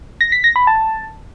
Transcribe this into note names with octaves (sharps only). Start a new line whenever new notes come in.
A#6
B6
A#6
B5
A5